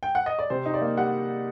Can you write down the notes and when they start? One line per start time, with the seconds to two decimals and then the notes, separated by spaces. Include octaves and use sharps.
0.03 G5
0.15 F#5
0.26 D#5
0.39 D5
0.50 C3 C5
0.66 D#4
0.74 D5
0.81 A#3
0.97 G3 F#5